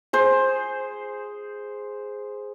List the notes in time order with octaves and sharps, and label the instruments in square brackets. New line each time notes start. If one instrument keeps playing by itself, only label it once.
[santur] G#4 C5